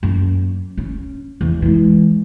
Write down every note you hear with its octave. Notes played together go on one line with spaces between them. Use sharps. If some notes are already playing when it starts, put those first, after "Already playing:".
F#2 A#3
C#4
E2
E3 G#3